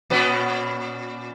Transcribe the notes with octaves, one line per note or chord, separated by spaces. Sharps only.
A#2 B3 C#4